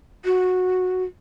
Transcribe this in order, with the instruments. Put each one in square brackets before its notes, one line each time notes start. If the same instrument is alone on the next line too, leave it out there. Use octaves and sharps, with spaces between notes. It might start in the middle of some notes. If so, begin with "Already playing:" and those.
[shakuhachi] F#4